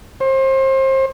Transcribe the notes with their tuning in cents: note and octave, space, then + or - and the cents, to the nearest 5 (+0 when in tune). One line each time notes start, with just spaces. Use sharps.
C5 +30